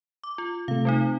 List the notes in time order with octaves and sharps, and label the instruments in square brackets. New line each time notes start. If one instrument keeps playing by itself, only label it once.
[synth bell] D6
F4
[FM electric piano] C3 A3 [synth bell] F5
[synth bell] G3 C4 D#4